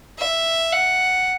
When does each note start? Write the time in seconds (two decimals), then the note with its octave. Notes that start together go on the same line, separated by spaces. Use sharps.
0.19 E5
0.73 F#5